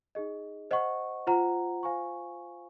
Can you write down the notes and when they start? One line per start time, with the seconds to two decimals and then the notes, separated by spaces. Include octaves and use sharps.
0.15 D#4 G#4 D#5
0.71 C5 D#5 F#5 C#6
1.27 F4 C5 F#5 A#5
1.83 F4 C5 F5 G#5 C#6